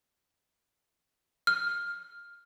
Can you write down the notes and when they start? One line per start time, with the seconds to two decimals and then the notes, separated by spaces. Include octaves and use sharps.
1.47 F6